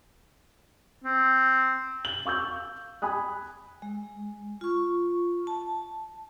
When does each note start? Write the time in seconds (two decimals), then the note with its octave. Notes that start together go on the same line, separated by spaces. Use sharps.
1.04 C4
2.05 F#7
2.25 F5 C#6 E6 G6
3.02 G#5 B5 D#6 F#6
3.82 G#3
4.61 F4 C#6
5.47 A5